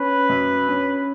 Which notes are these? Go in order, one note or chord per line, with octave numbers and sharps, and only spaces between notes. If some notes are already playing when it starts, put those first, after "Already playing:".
Already playing: C#4 B4
F#2
C#4